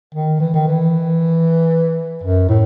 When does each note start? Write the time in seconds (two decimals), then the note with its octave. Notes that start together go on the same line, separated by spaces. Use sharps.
0.15 D#3
0.40 E3
0.54 D#3
0.68 E3
2.23 F#2
2.49 A2